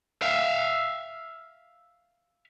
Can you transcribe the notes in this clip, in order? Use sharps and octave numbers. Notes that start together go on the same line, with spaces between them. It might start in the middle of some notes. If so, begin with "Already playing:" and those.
E5 F5